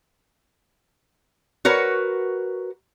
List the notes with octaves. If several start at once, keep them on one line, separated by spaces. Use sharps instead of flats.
F#4 A#4 B4 C#5